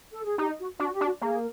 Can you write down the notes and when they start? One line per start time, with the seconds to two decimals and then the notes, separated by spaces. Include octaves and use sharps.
0.12 A4
0.24 G#4
0.38 D#4 G4
0.59 F#4
0.80 D4 F#4
0.93 G4
1.01 D4
1.05 F#4
1.21 A#3 G#4